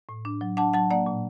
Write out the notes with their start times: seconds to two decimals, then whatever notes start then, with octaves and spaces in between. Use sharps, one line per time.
0.09 A2
0.25 D4
0.41 F#3
0.57 D4 F#5 A5
0.73 F#3 F#5 A5
0.90 A#3 D5 F#5
1.06 A#2